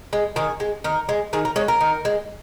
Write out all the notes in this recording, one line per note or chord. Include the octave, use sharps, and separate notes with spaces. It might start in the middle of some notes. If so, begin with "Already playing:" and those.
G#3
D#3 G#4
G#3
D#3 A#4
G#3
D#3 G#4
A#4
G#3 C#5
A#4
D#3
G#3